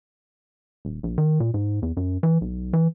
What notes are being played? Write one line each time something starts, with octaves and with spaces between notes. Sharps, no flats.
D#1
A#1
D#3
A#2
G#2
E2
F#2
E3
B1
E3